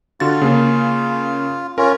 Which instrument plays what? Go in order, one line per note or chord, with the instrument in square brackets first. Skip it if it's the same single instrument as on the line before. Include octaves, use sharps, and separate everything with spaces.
[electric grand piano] D3 F#4 A6 [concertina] F4
[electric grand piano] C#3 A#3 C#4
[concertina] C#4 F4 [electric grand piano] A#4